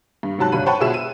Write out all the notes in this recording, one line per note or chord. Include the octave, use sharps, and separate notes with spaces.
G2
G#2 C3 F#3 A5 F#6
G1 G2 B2 G3 B5 D#7
C5 C#5 F#5 G5 A5 B5
B2 F4 G#4 E5 E6 E7
D#7